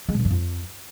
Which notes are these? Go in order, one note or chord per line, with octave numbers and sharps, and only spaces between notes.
G#3
B2
D#3
G2
F2